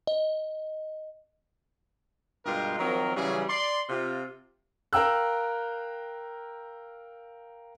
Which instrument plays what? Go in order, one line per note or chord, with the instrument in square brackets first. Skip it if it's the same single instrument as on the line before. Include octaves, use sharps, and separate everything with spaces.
[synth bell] D#5
[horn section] G2 B2 G#3 F4 G4 A#4
D#3 F3 F#3 C4 A#4
C#3 E3 F#3 G3 C#4 G#4
D5 C6
C3 F4
[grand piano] A#4 F5 G5 A#5 E6 F#6